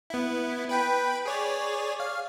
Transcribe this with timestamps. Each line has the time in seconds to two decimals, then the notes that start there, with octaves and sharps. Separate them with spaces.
0.10 B3 E4
0.69 B4 G5 B5
1.26 G#4 C#5 D5
2.00 F5